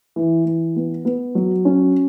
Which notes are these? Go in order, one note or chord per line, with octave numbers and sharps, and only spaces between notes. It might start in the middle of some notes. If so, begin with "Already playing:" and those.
E3
E3
B3
B3
F#3
C#4